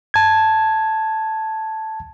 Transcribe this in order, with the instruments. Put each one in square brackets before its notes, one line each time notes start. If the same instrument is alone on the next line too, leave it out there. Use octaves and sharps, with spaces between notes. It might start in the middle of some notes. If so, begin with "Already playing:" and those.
[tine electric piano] A5 G#6